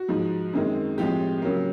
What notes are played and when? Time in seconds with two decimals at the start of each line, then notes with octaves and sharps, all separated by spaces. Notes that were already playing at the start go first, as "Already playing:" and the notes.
Already playing: F#4
0.08 G#2 F3 G#3
0.53 F#2 D#3 G#3 C4
0.97 A2 F3 G#3 C4 G4
1.42 C#3 F#3 A#3